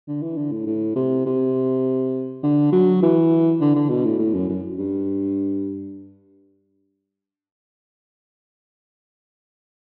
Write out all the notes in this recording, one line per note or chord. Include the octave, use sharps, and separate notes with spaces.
D3
E3
D3
A2
A2
C3
C3
D3
F#3
E3
D3
D3
B2
A2
A2
F#2
F#2
G2